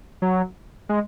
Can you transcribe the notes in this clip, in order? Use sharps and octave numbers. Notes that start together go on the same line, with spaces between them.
F#3
G#3